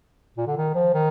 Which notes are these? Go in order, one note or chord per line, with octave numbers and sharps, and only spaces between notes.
A#2
D3
D#3
F3
D#3